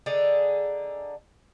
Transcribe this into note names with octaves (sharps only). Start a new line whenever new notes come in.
D3 D4 D#4 G#4